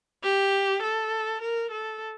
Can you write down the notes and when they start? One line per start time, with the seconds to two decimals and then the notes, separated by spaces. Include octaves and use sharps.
0.23 G4
0.83 A4
1.42 A#4
1.71 A4